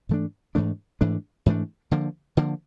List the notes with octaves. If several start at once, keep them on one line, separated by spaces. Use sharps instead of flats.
G#2 E3 A3 D4
G#2 E3 A3 D4
G#2 E3 A3 D4
G#2 E3 A3 D4
D3 F3 A#3
D3 F3 A#3